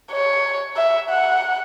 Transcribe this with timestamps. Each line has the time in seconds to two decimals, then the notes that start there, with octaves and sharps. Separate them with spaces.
0.12 C#5
0.77 E5
1.10 F#5